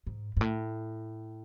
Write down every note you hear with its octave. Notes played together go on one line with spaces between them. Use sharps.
G#2
G#2
A2